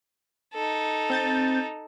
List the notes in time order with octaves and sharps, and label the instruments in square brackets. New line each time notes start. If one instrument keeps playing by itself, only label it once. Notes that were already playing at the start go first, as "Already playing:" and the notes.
[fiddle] D#4 A4
[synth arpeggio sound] C4 G6 A6